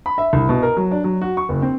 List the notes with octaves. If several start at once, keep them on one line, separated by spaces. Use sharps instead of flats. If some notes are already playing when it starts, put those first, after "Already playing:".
B5
E5
C2
B2
A#4
F#3
D4
F#3
F#4
C#6
F#1
C4